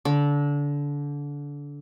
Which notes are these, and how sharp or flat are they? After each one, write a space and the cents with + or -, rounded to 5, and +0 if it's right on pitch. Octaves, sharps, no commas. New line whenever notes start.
D3 -25